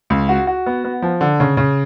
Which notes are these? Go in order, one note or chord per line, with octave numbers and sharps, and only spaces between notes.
C#2
F#4
F#4
B3
B3
F3
D3
C#3
C#3